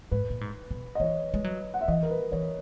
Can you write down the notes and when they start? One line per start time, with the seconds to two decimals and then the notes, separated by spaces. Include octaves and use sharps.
0.11 G#2 B4
0.30 A#2
0.41 G#2
0.71 B2
0.95 D#5
1.00 E3 C#5
1.34 G#3
1.44 F#3
1.74 F#5
1.81 E5
1.88 E3 D#5
2.03 A#4
2.10 B4
2.32 E3 C#5